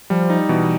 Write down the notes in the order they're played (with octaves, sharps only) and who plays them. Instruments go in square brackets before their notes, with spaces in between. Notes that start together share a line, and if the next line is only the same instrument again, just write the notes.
[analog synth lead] F3 [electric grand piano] G3
[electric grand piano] D#4
[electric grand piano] B2 [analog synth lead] E3